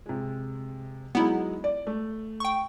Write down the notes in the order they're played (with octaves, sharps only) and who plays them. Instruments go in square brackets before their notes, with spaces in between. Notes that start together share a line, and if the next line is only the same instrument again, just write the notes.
[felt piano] C3 G#3
[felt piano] F#3 G#3 D#4 [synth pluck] B3 E4
[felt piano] D5
A3
[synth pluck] G5 C#6